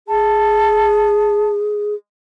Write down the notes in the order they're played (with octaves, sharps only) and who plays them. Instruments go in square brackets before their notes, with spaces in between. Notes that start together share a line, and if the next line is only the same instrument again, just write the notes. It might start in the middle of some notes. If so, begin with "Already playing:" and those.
[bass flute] G#4 [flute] A5